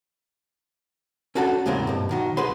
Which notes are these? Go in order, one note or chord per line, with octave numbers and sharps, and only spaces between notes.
C#4 D4 F#4 A4 A5
E2 A2 C#3 G#3 A#3 C4
G2 B2
B1 D#3 F#4
C2 G#4 B4 B5 C6